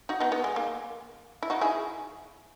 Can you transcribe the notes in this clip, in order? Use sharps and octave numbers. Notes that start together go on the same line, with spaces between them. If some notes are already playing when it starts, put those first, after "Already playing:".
D#4 F#4
B3 D#4
B3
G#3
A#3
E4
D#4 F#4
E4 G#4